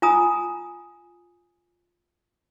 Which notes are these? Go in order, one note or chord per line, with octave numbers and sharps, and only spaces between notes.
F4 G#5 A#5 D#6